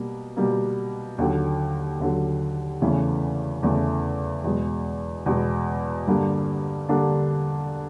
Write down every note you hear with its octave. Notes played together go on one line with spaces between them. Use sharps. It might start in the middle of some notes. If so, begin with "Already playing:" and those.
Already playing: B2 G3 A#3
B2 G3 A#3
D#2 D3 F#3
D#2 D3 F#3
E2 C#3 E3 A3
E2 C#3 E3 A3
E2 B2 G#3
E2 B2 G#3
G2 D3 G3 A#3 D4
D3 G3 A#3 D4